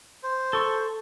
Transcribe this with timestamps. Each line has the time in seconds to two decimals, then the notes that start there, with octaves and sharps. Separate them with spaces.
0.23 C5
0.53 A4 C#6